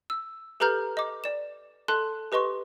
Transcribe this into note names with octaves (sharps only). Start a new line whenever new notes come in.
E6
G4 A4 B4 A#5 F6 G6
D#5 D6
D5 E7
A4 A5 C6 F#6
G4 B4 D#5 C6 C#6